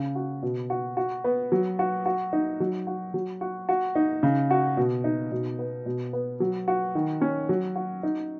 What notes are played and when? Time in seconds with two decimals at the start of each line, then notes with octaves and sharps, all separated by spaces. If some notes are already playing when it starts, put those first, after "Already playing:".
Already playing: C#3
0.15 F#4
0.43 B2
0.70 F#4
0.97 F#4
1.24 B3
1.52 F#3
1.79 F#4
2.06 F#4
2.33 D#4
2.60 F#3
2.87 F#4
3.14 F#3
3.41 F#4
3.69 F#4
3.95 D#4
4.23 C#3
4.51 F#4
4.77 B2
5.04 D#4
5.32 B2
5.59 B3
5.86 B2
6.13 B3
6.40 F#3
6.68 F#4
6.95 D#3
7.22 C#4
7.49 F#3
7.76 F#4
8.03 D#4